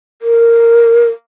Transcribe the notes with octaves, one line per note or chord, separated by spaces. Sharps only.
A#4